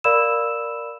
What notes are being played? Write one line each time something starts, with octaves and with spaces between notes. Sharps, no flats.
A#4 D5 F5 B5 E6 E7